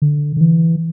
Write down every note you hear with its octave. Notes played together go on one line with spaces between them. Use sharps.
D3
D3
E3